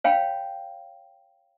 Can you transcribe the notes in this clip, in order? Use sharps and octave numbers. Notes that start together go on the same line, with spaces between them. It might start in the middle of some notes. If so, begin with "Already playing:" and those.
C#5 F5 G5 B5